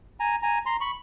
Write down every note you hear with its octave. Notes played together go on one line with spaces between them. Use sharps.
G#5 A#5
G#5 A#5
A#5 C6
B5 C#6